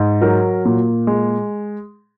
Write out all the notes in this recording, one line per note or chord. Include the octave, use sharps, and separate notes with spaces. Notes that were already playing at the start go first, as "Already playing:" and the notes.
Already playing: G#2
F#3 A#4
A#2
G#3